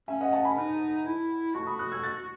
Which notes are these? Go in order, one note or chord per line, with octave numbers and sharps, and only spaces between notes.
C#4 E5 G#5
D#5 F#5
F#5 A5
G#5 B5
D#4
E4
F#4 A5 C#6
B5 D#6
D#6 F#6
E6 G#6
F#6 A6